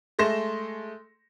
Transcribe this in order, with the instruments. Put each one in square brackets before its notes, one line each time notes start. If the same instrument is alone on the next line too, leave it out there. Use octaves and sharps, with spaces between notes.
[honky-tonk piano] G#3 A3 C6 A#6 E7